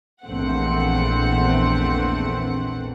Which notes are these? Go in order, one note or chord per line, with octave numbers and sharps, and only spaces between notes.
A#1 E2 A3 C4 F#5